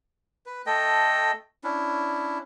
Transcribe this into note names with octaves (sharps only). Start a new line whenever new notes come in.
B4
A3 A4 D#5 G5
C#4 D4 E4